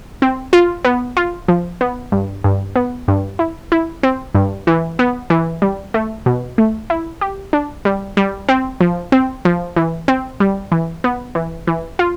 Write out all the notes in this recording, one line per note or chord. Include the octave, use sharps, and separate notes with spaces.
C4
F4
B3
F4
F3
B3
G2
G2
B3
G2
E4
E4
C4
G2
E3
B3
E3
G3
A3
B2
A3
E4
G4
D4
G3
G3
C4
F3
C4
F3
E3
C4
G3
E3
B3
E3
E3
F4